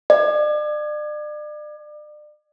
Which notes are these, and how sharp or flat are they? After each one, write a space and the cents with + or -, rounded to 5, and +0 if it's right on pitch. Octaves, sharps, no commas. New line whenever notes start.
D5 +35